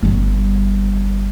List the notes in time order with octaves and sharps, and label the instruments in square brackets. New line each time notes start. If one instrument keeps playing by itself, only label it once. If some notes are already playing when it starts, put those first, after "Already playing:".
[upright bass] G1 G3